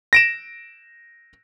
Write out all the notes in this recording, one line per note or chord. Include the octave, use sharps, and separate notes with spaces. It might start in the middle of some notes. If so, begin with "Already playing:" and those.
A#6 D7 E7